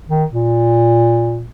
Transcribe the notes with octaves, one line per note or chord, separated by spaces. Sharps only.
D#3
A#2